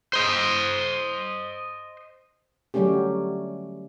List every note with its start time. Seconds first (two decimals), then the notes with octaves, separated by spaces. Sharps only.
0.13 C5 D#5
2.74 D3 F#3 G3 A3 C#4 G4